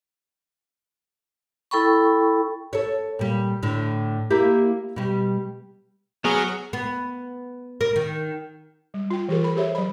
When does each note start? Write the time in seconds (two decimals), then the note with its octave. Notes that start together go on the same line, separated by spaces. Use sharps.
1.71 E4 A4 G5 B5 C#6
2.73 A4 C#5
3.19 A#2 G3
3.63 A2 D3
4.30 A#3 E4 G4
4.96 B2 G3
6.25 F#3 B3 G#4 A#5 C#6 F6
6.73 B3
7.81 A#4
7.96 D#3
8.94 G3
9.10 F4 G5
9.29 E3 F4 G4 G#4 A#4
9.43 A4 B5
9.57 G4 G#4 C5 C#5 E5
9.75 F#3 B5